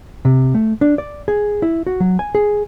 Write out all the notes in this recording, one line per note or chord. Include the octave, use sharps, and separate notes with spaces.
C3
A3
D4
D5
G#4
E4
F#4
F#3
G#5
G#4